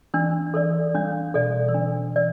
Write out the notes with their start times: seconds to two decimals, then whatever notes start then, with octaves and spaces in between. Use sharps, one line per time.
0.14 E3 D4
0.54 E3 A4 D5
0.95 G3 D4
1.34 B2 A4 D5
1.69 E3
1.75 D3 D4
2.16 E3 D5